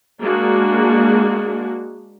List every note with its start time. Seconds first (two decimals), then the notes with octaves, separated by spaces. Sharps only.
0.23 G#3 A#3 D4 F#4